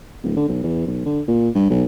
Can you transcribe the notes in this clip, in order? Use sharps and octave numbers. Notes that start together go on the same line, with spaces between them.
D1
D3
B1
E2
B1
D3
A#2
G2
B1